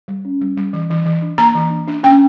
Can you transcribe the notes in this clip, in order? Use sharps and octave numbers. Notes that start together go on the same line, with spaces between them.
G3
C#4
G3
G3
E3
E3
E3
D4
A#3 A#5
E3
D4
D4
C#4 G5